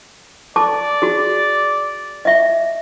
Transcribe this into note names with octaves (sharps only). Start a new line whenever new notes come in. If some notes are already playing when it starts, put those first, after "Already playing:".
A4 D5 A5 D6
F#4 G#4
D#5 E5